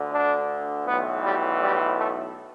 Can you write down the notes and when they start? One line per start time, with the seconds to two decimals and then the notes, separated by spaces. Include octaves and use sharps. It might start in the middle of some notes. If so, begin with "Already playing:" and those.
Already playing: D2 D3
0.12 D4
0.86 B1 A2 E3 B3
1.24 G3
1.61 G3
1.98 A3